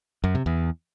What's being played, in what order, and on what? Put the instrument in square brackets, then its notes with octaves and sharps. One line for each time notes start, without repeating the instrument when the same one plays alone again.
[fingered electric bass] F#2
C3
E2